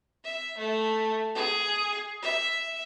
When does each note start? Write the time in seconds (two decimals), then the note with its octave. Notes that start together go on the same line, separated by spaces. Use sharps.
0.24 E5
0.58 A3
1.35 G#4
2.22 E5